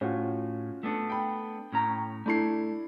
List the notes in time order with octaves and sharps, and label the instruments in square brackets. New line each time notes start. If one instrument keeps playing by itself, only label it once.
[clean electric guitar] A2 [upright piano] C#4 F4 F#4
[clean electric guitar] A3 B3 D4
[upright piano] G5 B5
[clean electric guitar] A2 C#4 A#5
[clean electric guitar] A3 [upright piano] D4 E4 C7